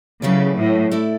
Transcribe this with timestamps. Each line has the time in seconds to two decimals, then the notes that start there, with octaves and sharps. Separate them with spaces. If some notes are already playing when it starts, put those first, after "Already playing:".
0.22 C#3 F#3 A3 E4 B4 D5
0.58 A2
0.91 A3 E4 A4 D5